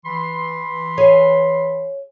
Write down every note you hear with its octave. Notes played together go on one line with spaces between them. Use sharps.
E3 B5 C6
G#4 C#5 G#5